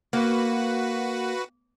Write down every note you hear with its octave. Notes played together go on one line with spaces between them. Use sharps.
A#3 F#4 B4